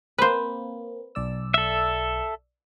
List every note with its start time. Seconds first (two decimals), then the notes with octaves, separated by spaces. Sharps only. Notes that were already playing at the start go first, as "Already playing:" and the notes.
0.18 A#3 C4 B4 C5
1.15 B1 D5 E6
1.54 A4 E5